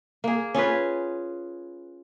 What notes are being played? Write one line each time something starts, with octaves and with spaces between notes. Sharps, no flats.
A#3 G#4
C#4 F4 G#4 B4